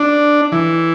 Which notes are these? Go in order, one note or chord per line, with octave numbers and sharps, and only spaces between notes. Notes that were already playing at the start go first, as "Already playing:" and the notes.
Already playing: D4
E3